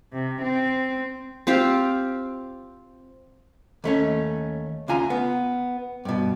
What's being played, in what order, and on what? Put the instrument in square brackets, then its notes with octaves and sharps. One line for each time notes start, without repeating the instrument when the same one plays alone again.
[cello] C3
C4
[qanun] C4 F4 G4 F5
[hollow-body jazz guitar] D#2 A3 C#4
D2 C#3 F4 G#5 A#5
B3
G2 B2